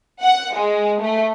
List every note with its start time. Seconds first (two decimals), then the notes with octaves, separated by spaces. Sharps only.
0.22 F#5
0.55 G#3
1.01 A3